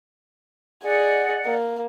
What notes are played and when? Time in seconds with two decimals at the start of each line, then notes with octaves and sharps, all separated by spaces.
0.84 G#4 D5 D#5 F#5
1.45 A#3